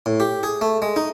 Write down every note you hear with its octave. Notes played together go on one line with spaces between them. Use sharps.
A2
G4
G#4
A3
G#3
D#4